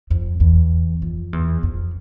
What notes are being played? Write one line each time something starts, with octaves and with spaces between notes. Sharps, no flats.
F2
E2
F2
E2
F2